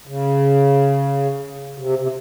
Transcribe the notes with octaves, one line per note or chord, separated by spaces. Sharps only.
C#3
C3
C3